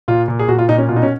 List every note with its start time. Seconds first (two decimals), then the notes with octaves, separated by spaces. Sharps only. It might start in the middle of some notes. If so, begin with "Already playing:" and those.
0.08 A#2 F4
0.28 A#2
0.39 G#4
0.49 A#2 F#4
0.59 F4
0.68 A#2 D#4
0.78 C#4
0.89 B2 F4
0.96 D#4
1.03 C#4